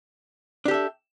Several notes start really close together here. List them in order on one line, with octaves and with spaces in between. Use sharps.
D4 G4 A4 E5